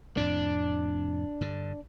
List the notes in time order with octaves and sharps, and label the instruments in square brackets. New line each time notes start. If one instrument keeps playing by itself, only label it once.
[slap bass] F2 A2 C3 [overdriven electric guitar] D4
[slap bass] G2 D3